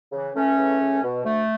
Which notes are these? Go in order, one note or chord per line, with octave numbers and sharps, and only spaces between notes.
C#3 E3
C#2 A3 C#4
C#3 E3
C#2
B2
D2 A3